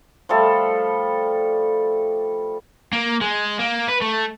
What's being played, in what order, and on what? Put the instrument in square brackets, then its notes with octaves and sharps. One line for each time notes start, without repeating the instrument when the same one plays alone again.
[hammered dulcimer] F3 G3 A3 A4
[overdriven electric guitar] A#3
G#3
A#3
B4
A3